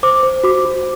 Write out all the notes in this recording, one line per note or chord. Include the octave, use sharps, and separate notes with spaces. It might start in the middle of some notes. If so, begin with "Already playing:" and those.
C5 D6
C5
F#4 D6
F#4